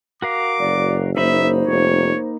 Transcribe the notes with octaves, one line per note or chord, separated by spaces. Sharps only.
F#4 A#4 F5 D6
F#1 D5
A#3 D#4 C5 E5 B5
F1 C#5